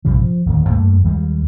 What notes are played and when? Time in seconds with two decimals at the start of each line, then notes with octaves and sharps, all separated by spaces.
0.05 A#1 G2 C3 F3
0.20 F3
0.46 D1 D#2
0.69 F#2 A3 A#3
1.04 D#2 G3 G#3